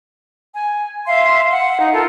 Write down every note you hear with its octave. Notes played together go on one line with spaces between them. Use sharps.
G#5
E5 F5 C6
F#5
D#4
F4 A4 A#4